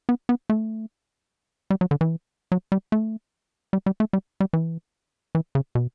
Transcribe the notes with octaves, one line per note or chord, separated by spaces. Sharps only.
B3
B3
A3
G3
F#3
D3
E3
F#3
G3
A3
G3
G3
A3
G3
G3
E3
E3
C#3
B2